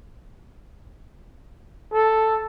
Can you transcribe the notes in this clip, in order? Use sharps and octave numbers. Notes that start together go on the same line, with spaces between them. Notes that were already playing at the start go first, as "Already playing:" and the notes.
A4